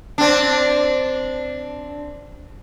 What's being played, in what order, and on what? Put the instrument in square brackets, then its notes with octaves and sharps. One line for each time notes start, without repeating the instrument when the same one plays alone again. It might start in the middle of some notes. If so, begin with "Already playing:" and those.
[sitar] C4 D4